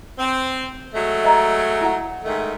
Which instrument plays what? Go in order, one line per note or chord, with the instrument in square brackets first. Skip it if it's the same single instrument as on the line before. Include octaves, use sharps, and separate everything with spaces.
[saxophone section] C4
F#3 G#3 A3
[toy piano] D#5 E5 A#5
E4 F#5
[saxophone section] G#2 D#3 A3